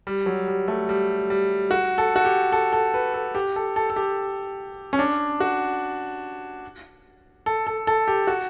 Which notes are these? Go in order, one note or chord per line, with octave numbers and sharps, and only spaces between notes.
G3
F#3
G3
A3
G3
G3
F#4
A4
F#4
G4
A4
A4
B4
A4
G4
A4
A4
A4
G4
C#4
D4
F#4
A4
A4
A4
G4
F#4